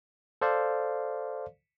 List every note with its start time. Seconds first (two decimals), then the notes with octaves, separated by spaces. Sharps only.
0.41 A4 C5 D5 F5